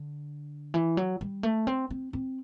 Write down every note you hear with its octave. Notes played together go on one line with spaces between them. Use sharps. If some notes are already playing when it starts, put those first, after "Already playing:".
Already playing: D3
E3
F#3
G3
A3
C4
C4
C4